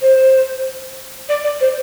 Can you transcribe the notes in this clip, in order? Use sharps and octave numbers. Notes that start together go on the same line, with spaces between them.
C5
D5
D5
C5